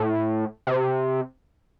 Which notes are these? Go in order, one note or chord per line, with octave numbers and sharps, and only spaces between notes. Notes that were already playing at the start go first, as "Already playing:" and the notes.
Already playing: A2
C3